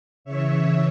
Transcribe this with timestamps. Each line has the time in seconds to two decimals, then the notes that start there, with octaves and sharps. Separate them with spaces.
0.24 C#3 E3 C#5 E5